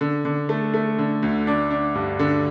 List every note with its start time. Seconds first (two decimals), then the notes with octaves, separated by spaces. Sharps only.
0.01 D3
0.25 D3
0.49 A3
0.74 A3
0.98 D3
1.22 D2
1.47 D4
1.70 D4
1.95 G2
2.19 D3